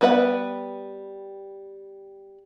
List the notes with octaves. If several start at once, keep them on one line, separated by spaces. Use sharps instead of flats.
G3 B3 B4 D5 F#5